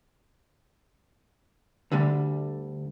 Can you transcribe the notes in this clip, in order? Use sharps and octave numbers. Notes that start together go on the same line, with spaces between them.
D2 D3 G3